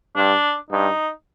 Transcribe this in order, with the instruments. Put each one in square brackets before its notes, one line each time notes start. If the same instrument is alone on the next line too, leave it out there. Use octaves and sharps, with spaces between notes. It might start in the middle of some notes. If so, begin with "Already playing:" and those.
[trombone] G2 [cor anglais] D4
[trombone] G2 [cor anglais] D#4